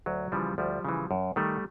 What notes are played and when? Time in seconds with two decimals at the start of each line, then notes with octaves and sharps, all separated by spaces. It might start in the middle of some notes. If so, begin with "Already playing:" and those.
0.06 D2 F#3
0.32 C#3 E3 F3 G3
0.58 D2 F3 G3
0.85 C#3 E3
1.11 F#2
1.36 D#3 G3 A3